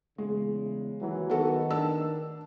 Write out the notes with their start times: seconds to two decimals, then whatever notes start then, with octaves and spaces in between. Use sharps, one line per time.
0.18 E2 C#3 G#3
1.01 D#2 E3 F#3
1.30 D#3 B3 F#4 A4
1.70 D4 A5 E6